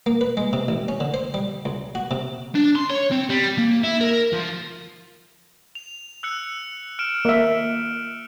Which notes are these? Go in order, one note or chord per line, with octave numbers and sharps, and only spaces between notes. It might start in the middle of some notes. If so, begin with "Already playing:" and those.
A#3
B4
G#3
C3
A1
C#4
D3
C5
G3
C#2
F#4
C3
D4
C6
C#5
C4
G3
A#3
E4
A#4
F3
F7
E6 F#6 C#7
F6 D7 E7
A#3 E5